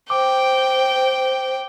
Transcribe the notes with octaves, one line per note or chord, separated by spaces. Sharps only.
C5 G5 D6